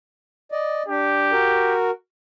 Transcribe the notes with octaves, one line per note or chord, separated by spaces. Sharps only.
D5 D#5
D4 G4
F#4 A#4